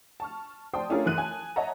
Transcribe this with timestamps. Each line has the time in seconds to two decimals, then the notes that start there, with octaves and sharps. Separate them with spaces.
0.20 A5 C#6 F6
0.74 C5 D5 G5 A5 C6 D#6
0.90 A3 C#4 D4 F4 G#4 A#4
1.05 F#2 E3 F#6 D#7
1.18 G#5 A5
1.56 C#5 D#5 E5 F#5 A5 A#5